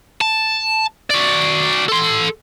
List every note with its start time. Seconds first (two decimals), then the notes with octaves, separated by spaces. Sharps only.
0.21 A5
1.10 F#4 D5
1.88 A4 C6